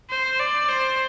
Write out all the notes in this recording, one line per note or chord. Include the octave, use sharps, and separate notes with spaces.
C5
D5
C5